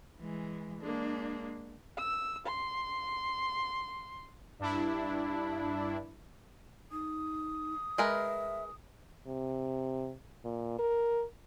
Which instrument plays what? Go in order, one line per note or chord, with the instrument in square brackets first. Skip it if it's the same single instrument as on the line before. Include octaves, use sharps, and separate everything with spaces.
[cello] E3 G#3
[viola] G#3 A#3 [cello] D4
[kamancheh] E6
C6
[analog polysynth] G2 D4 E4
[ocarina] D#4 [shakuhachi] D#6
[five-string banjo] G#3 A#4 B4 [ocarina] E5
[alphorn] C3
A#2
A#4